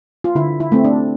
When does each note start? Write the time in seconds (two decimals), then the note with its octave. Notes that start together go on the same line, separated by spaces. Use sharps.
0.24 F4
0.35 D3 E4
0.60 E4
0.72 A3 C4
0.84 D4